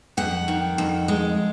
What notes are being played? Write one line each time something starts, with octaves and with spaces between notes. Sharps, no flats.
F2 F#5
D#3
F2
G#3